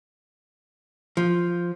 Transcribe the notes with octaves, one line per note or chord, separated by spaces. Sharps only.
F3